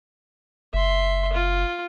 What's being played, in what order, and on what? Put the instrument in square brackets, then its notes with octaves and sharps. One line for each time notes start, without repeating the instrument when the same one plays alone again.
[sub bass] F#1 [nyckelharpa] E5 C6
[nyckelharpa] F4